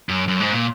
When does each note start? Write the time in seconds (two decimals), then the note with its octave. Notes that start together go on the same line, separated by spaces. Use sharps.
0.09 F#2
0.28 F#2
0.40 G#2
0.53 A#2